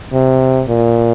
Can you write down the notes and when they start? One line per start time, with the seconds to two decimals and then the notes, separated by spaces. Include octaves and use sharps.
0.13 C3
0.68 A#2